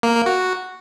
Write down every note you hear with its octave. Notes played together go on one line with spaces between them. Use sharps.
A#3
A#3
F#4